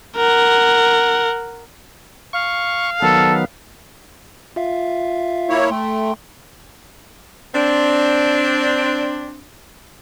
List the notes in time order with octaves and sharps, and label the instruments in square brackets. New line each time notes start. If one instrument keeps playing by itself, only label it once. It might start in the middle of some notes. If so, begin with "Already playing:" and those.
[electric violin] A#4 F#5
[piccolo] F5 [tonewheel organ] C#6
[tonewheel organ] D#3 F#3 B3 [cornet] A4
[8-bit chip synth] F4 E5 F5
[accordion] A#3 E4 C#5
[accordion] A3 [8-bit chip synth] G5 C6
[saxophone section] C4 D4